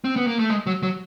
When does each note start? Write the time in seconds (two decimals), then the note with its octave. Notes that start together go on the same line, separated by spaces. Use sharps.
0.04 C4
0.16 B3
0.27 A#3
0.39 A3
0.50 G#3
0.67 F#3
0.83 F#3